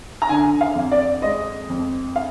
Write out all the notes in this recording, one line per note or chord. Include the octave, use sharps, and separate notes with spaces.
A#5
D3 G#5
F5
F2
D5
G#3 D#5
F2
F5